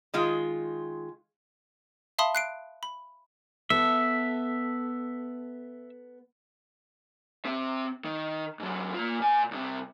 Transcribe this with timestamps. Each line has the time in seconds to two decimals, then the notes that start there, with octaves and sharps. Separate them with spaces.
0.14 D#3 G#3 F4
2.19 E5 F5 A5 B5 C6 D#6
2.35 F#6 C7 D7
2.83 B5
3.70 B3 A4 E5
7.45 C4 E5
8.05 D#3
8.60 G#2 F#3
8.94 A#3 F4
9.20 A#2 G#5
9.51 C2 C3